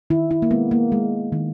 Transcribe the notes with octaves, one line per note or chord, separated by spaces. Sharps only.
D#3 E4
E4
A#3
G#3 B3
A#3
G#3
D#3